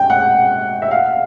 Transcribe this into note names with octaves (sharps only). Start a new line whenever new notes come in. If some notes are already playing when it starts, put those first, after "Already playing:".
Already playing: G5
F#5
E5
F5